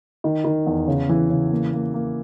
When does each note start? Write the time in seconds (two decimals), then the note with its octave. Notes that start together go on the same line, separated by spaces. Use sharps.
0.24 D#3
0.45 D#3
0.66 E2
0.88 C#3
1.09 E3
1.30 C#3
1.51 A#3
1.73 A#3
1.94 A#3